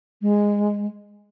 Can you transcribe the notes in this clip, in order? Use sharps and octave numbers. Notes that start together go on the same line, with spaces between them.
G#3